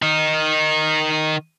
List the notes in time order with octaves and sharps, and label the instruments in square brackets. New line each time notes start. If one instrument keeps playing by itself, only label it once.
[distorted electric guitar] D#3 D#4